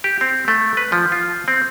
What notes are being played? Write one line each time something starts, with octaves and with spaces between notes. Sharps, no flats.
G4
C4
A3
B4
F3
F4
C4